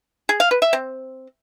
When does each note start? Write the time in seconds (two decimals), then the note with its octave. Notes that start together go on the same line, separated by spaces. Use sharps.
0.29 G#4
0.40 F5
0.51 B4
0.62 E5
0.73 C4